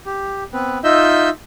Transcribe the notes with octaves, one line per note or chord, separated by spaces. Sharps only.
G4
B3 C4 B4
D#4 F4 D#5 E5 E6 G6